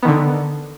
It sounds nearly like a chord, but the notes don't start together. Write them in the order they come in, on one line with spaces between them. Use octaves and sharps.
B3 D#3 D3